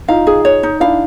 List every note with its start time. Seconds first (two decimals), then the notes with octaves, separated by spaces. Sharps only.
0.08 D#4 F4 F5
0.27 G#4
0.45 C#5
0.63 D#4
0.80 D4 E4 F5